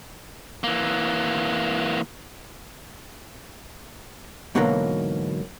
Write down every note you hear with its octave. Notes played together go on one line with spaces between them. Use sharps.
E3 A#3
G#2 B2 D3 E3 F#3 A#3